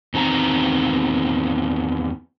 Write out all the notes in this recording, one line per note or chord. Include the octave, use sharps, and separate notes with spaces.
E2 D#3 C4 G#5 A#5